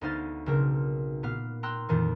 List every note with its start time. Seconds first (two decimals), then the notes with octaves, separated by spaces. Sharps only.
0.01 D2 B3 D#4 C5 F5 A6
0.46 B1 C#3 C4 A#4
1.23 A#2 B3 F5
1.63 G5 A#5 C6 E6 F#6
1.89 F2 A#2 D#3 E3